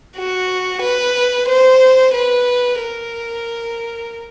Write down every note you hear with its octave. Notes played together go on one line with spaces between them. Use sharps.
F#4
B4
C5
B4
A#4